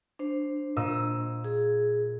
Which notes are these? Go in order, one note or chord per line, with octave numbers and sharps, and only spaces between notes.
D4 C5
A#2 D#5 E6
G#4